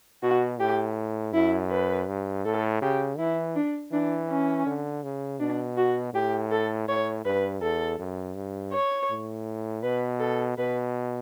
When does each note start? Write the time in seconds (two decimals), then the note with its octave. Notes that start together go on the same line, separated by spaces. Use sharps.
0.23 B2 F#4
0.60 A2 G4
1.33 F#2 E4
1.70 B4
2.08 G2
2.45 A2 A4
2.82 C#3 G4
3.18 E3 E4
3.56 D4
3.92 E3 D4
4.29 C#4
4.66 D3
5.03 C#3
5.40 B2 D4
5.77 F#4
6.14 A2 G4
6.51 A4
6.89 A2 C#5
7.25 G2 B4
7.61 E2 A4
7.99 F#2
8.36 G2
8.73 C#5
9.10 A2
9.83 B2 B4
10.20 A4
10.58 B2 B4